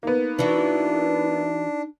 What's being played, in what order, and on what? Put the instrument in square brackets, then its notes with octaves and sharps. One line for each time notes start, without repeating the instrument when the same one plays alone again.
[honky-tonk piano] A#3 B3 [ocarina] D#4
[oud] E3 F#4 [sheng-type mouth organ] D4